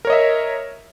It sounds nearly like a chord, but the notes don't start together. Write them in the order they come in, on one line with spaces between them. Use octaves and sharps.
A#4 C#5 D#5 E5